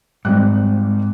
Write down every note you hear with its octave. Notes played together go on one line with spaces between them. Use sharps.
G#1 G#2 G3 F#6